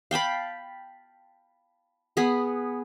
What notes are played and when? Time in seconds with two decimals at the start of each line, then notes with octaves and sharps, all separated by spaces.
0.11 F5 G5 A5 B5
2.17 B3 G#4